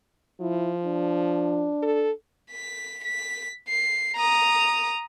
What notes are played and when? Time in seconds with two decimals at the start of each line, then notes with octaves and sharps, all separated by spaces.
0.41 F3 E4
0.84 D4
1.83 A4
2.51 B6
3.04 B6
3.68 C7
4.16 A#5 D#6